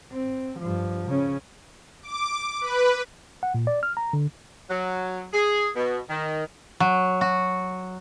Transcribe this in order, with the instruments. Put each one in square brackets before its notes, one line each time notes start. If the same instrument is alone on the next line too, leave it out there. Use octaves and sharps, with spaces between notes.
[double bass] C4
G2 F3
C#3 C#4
[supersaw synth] D6
B4
[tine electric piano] F#5
A#2
D5
F6
A#5
D3
[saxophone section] F#3
G#4
B2
D#3
[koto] F#3
F#4